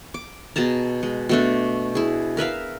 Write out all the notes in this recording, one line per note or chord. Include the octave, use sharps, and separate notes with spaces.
D6
B2 G#4 A5 A#5
G#3
B2 A3 D4
E4 G#4
A#4 B4 E5 F5